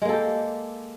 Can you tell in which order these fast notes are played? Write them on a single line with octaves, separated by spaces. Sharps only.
G#3 A#3 A4 G4